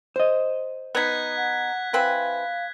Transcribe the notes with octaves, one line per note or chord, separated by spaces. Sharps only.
C5 D#5
B3 D#4 F#6 G#6 B6
F#5
E3 C4 B4 F5